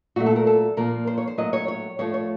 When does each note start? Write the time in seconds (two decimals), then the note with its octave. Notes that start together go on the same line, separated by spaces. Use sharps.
0.16 A#2 F#3 A3 F#4
0.26 A4
0.36 A#4
0.47 A4
0.77 A#2 F3 A#3 A#4
1.07 C5
1.18 C#5
1.27 C5
1.38 A2 F#3 A#3 D#5
1.53 C#5
1.68 C#5
1.99 A2 F3 A3 C#5
2.14 C#5